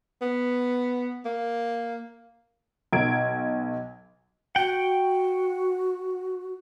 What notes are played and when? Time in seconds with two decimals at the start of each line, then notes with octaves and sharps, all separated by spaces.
0.21 B3
1.25 A#3
2.93 B1 G#6 D7
4.55 F#4 F#5 G5